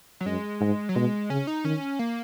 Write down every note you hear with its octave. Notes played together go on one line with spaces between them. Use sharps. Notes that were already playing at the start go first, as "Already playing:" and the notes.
F#3
F#2 G#3
G#2
F#3
B2 G#3
C#3 C#4
D#4
D#3 C#4
A#3